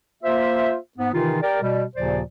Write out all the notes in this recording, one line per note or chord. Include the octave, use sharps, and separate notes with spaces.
A#3 F4 C5 E5
G#2 B3
C3 D#3 E3 D#4 F4
G4 A#4 D5
B2 G3
D#2 A#2 C#3 F3 C5 D5